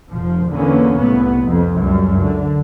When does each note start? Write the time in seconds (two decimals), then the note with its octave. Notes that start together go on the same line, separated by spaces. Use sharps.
0.10 F1 F3
0.53 E2 D3 A#3 B3 C#4
0.99 C2 A2 B3
1.46 F2
1.81 C#2 F#2 G3
2.22 D3